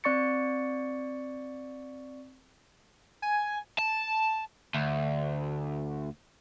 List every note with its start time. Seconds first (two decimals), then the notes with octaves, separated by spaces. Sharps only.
0.04 C4 D5 C#6 A6 C#7
3.22 G#5
3.79 A5
4.74 D2